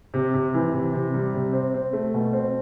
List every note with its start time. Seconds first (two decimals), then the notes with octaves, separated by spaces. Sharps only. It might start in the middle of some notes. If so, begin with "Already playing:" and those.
0.14 C3
0.34 C3
0.54 E3
0.73 C3
0.93 C3
1.14 G3
1.34 C3
1.53 C4
1.74 C4
1.93 A3
2.14 B2
2.33 C4